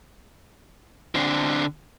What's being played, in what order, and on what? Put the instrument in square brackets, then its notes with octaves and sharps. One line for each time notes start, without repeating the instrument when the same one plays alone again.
[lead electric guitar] D3 C4